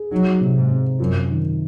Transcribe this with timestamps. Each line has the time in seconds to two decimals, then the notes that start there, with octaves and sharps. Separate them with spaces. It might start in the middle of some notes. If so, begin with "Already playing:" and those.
Already playing: G#4
0.12 F#3 D#4
0.41 C3
0.56 G#2
0.70 C4
1.00 F#2 F4
1.29 D#3